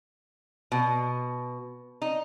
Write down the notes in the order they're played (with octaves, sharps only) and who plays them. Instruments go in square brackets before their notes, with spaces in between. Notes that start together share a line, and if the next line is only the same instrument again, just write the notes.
[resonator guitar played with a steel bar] B2
D#4